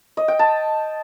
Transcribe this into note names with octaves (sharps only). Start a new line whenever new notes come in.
D#5
G5
A5